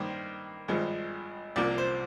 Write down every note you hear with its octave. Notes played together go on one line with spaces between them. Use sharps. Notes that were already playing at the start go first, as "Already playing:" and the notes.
Already playing: G2 D#3 A#3 C5
G#1 G2 F3 G#3
C2 C3 F3 A#3 D5
C5